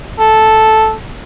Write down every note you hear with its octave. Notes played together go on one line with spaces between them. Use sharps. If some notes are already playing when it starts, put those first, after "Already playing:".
A4